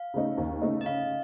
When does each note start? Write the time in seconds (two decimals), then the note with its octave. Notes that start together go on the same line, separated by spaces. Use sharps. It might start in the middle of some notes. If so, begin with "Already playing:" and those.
Already playing: F5
0.14 C#3 A3 D#4
0.38 D#2
0.62 C#3 A3 D#4
0.81 D#5
0.86 C#3 F5